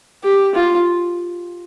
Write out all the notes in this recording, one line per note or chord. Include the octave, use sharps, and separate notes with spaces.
G4
F4